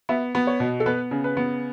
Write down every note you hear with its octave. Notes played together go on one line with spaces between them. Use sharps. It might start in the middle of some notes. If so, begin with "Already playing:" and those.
B3 E5
B3
C#5
B2
A4
B3 B4
C#3
B4
B3